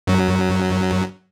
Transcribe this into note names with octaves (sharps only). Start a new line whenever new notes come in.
F#2 F#3